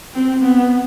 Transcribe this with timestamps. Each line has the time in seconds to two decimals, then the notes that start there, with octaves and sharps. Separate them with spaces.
0.14 C4
0.43 B3